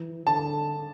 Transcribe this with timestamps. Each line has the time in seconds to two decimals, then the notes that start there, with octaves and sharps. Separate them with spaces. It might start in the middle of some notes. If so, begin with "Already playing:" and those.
Already playing: E3
0.27 D3 A5